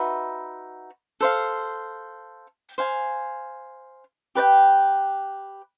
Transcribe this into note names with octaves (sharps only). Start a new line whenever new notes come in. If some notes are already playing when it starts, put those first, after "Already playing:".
Already playing: D#4 F#4 B4 E5
A4 C5 F5
C5 F5 G#5
G4 B4 D5 G5